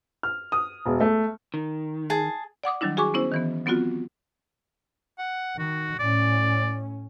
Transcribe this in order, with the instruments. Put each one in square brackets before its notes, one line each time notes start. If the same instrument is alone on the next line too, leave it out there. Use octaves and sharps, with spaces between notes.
[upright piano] F6
D#6
E1
A3
[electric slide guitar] D#3
[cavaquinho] G#4 A5
[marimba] D5 F#5 D6 D#6
D#3 F#3 G3 D4 E4
F#4 G#4 G#5 C#6 D6
B3 C#4 E4 C5
D#3 E3 B3
F#3 B3 C4 F4 F#4
[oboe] F#5
[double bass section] D#3 [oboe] F#4
[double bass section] A2 C#4 [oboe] D5